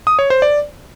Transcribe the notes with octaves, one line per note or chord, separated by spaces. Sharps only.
D#6
C#5
C5
D5